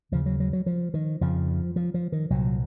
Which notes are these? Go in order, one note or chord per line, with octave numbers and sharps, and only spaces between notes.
D#2 C#3 F3
F#3
F#3
F#3
F3
D#3
F2 C#3 F3
F3
F3
D#3
C2 A#2 F#3